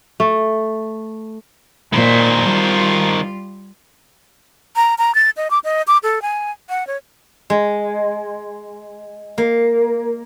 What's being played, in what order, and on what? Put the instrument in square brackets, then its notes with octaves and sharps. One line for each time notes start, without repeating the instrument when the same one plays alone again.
[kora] A3
[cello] A#2 [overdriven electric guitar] D#3 C5
[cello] G3 F4
[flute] A#5
A#5
A6
D#5
D6
D#5
D6
A4
G#5
F#5
C#5
[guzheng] G#3
A#3